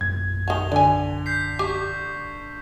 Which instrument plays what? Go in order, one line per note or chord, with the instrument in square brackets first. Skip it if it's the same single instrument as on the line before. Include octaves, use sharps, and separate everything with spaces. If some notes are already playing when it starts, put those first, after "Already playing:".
[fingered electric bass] A#1 F#2 [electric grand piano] G#6
[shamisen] D#3 F#4 [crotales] F7 G7
[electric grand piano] D3 [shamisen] D5 G#5
[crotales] G6 B6 C7
[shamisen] G4 [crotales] C#6 B6